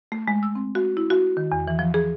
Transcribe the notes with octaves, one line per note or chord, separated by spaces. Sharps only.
A3
G#3
E6
C4
F#4
E4
F#4
D#3
E2
E3
F3
G#4